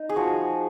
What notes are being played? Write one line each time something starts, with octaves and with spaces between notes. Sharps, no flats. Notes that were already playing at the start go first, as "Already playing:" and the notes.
Already playing: D#4
G#4
F3 F#4